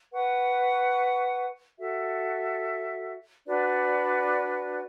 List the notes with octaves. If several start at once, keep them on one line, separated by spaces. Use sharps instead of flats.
B4 F#5 C#6
F#4 A4 E5
D4 F#4 B4 D5